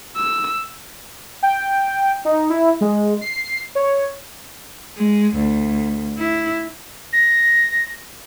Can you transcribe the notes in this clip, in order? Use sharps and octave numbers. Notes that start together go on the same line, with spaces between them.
E6
G5
D#4
E4
G#3
C7
C#5
G#3
D2
E4
A#6